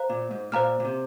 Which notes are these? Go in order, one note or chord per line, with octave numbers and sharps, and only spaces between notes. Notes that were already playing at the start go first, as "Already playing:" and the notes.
Already playing: C5 F5 A#5
A#2
G#2
A#2 C5 F5 A#5 F6
A#2
C3